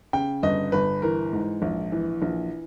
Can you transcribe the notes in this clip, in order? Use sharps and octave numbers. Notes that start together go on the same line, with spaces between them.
C#3 G5
G1 D#5
G1 B4
E3 A#4
G#2
A#1
E3
A#1